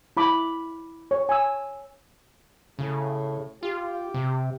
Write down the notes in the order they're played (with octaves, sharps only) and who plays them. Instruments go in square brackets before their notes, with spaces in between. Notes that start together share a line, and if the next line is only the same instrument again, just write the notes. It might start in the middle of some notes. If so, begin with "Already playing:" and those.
[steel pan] E4 B5 D6
C#5
G#5 E6
[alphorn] A2 [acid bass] C#3
[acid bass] F4 [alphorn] G4
[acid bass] C3